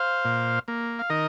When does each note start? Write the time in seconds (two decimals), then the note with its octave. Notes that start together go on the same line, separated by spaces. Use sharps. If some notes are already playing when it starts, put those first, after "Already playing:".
Already playing: C5 F5
0.25 A#2
0.68 A#3
0.99 F5
1.10 D#3 A#4 D#5